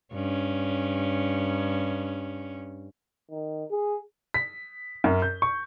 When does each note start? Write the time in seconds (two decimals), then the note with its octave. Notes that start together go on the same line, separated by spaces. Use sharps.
0.13 G2 C#4
3.30 D#3
3.71 G#4
4.34 B6
5.04 F#2
5.22 G6
5.42 C#6